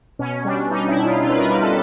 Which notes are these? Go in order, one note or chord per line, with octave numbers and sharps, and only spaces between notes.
B2 C#4
G3 D4
G3 D#4
E4
B2
F4
B2 F4
B4
A#4
G3 B4
A4